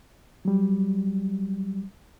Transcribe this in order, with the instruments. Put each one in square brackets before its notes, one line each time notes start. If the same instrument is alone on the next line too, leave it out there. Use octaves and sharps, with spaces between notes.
[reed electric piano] F#3 G3